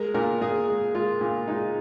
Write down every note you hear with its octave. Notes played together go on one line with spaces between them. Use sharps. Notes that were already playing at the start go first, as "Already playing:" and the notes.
Already playing: G#3 A#4
A#2 A#4
A#2 G#4
G#3
G#3 F4
A#2
G#3 D#4